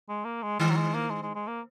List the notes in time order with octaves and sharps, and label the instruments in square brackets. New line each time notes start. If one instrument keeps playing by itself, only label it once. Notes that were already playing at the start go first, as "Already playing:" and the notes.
[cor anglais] G#3
A#3
G#3
[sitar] D#3 [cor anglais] G#3
[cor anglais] F#3
G#3
A#3
G#3
G#3
G#3
A#3